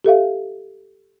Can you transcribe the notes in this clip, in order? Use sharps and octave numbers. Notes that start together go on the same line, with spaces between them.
G4 A4 E5 F5